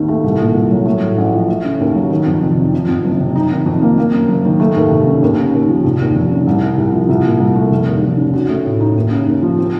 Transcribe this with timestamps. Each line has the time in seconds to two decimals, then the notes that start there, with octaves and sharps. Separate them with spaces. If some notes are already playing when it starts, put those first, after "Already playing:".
Already playing: D#2 D#3 C4
0.08 A3
0.24 C2
0.39 A#2
0.54 C2
0.71 F#3
0.86 A3
1.01 A2
1.18 A1
1.33 F3
1.48 A3
1.65 C#3
1.80 D#2
1.95 F#3
2.10 D#3
2.26 F2
2.42 F1
2.58 C3
2.73 F3
2.88 F2
3.04 F#1
3.20 C3
3.36 D#4
3.51 D#3
3.66 F2
3.82 A#3
3.98 A#3
4.13 F#2
4.28 F#1
4.45 D#3
4.60 A3
4.76 D#2
4.91 F1
5.07 C#3
5.23 D#2
5.37 C#3
5.53 D#2
5.69 F3
5.84 F1
6.00 D#2
6.15 F1
6.31 C#3
6.47 C2
6.62 C3
6.77 C2
6.93 F3
7.09 C2
7.24 A#2
7.39 C2
7.55 A3
7.71 F1
7.87 D#2
8.02 F1
8.17 C#3
8.34 F#4
8.49 A3
8.65 A2
8.81 D#4
8.96 D#2
9.11 C#3
9.27 D#2
9.42 F3
9.58 C4